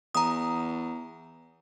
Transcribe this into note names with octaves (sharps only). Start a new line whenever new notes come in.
E2 A#5 D#6